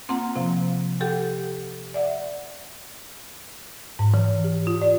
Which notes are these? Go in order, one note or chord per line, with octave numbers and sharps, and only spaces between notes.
A#3 C4 F4 F#5 A#5
C3 F3
G4 A4 F#5 G5
D5 E5 F#5
G#2
E3
G4
F4
D5